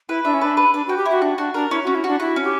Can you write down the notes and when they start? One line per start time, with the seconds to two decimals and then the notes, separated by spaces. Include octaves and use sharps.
0.09 E4 B4
0.25 D4 E5
0.34 C#4
0.41 D4 B4
0.57 B4
0.73 D4 B4
0.87 F#4 G5
0.97 G4
1.06 E4 F#4
1.22 D4 F#4
1.38 D4 F#4
1.54 D4 A#4
1.71 C#4 E4
1.83 F#4
1.87 C#4
1.95 E4
2.04 D4 F#4
2.20 E4 F#4
2.36 C#4
2.44 G4